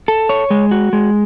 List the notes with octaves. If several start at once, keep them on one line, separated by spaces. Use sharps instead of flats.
A4
C#5
G#3
F#4
G#3